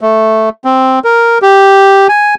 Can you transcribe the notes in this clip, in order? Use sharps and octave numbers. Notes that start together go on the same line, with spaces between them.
A3
C4
A#4
G4
G#5